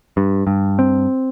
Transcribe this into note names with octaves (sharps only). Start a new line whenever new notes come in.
G2
G2
C4